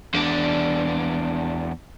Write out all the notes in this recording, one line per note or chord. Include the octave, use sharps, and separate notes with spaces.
E2 D4